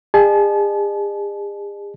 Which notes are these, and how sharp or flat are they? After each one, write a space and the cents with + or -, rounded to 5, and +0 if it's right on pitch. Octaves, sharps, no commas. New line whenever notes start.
G#4 -40 D#5 -45 A5 -40